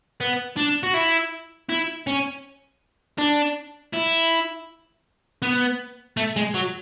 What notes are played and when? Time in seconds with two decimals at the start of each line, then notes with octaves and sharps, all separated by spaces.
0.21 B3
0.57 D4
0.83 F#4
0.94 E4
1.70 E4
2.07 C#4
3.18 D4
3.93 E4
5.42 B3
6.17 A3
6.36 G#3
6.54 F#3